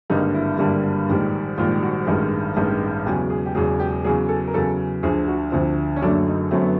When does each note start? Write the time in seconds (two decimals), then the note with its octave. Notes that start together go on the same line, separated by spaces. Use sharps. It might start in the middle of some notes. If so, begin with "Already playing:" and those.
0.10 G#1 G2 D3 G3 A#3 D#4
0.34 E4
0.59 G#1 G2 D3 G3 A#3
1.09 A#1 G#2 D#3 G3
1.58 A#1 G#2 D#3 G3 F4
1.83 F#4
2.07 A1 G2 D#3 G#3
2.56 A1 G2 D#3 G#3
3.05 E1 E2 C#3 F#3 G4
3.30 G#4
3.46 G4
3.55 E1 E2 C#3 F#3 G#4
3.80 G4
4.04 E2 C#3 F#3 G#4
4.29 A4
4.47 A#4
4.54 E2 C#3 F#3 A4
5.03 D2 D3 F3 G#4
5.27 F#4
5.52 D2 D3 F3 C4
5.96 C#4
6.02 F#1 F#2 D3 F#3 A3 D4
6.27 D#4
6.51 F#2 D3 F#3 A3 C4
6.62 B3